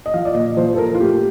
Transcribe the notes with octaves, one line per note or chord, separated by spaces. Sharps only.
D#5
F3 F5
D5
A#2 D#5
F3 C5
A4
A#2 A#4
F4
A3 G4